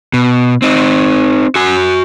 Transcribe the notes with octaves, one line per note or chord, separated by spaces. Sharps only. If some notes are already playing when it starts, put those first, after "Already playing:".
B2
C4 D#4
F#4 G#5